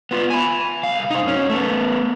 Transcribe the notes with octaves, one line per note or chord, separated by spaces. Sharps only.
B3 F4
G#5 B5
C2 F5
D#4 C5
F#2 C#4
A3 B3